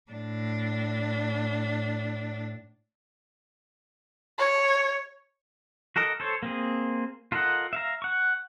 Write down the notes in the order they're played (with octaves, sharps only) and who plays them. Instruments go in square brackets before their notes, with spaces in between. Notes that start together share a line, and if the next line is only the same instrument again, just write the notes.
[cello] A2 D4
[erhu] C#5
[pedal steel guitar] F#4 A4 A#4 D#5
A4 C5 C#5
A#3 C4 G#4
F4 A4 A#4 D#5 F#5
E5 F5 A#5
F#5 C#6